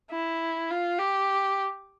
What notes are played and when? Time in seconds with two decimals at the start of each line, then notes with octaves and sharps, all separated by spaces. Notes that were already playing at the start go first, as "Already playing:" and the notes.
0.11 E4
0.70 F4
0.99 G4